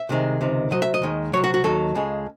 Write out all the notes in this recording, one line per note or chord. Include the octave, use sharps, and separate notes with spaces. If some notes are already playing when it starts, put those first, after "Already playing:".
Already playing: E5
C2 C3 D#3 G#3
C#2 C3 D#3
C2 C3 F#3 D#5
E5
D#5
D#2 D#3 G#3
C2 C3 F#3 C#5
F#4
F#4
D#2 D#3 F#3 A4
C#2 C#3 G#3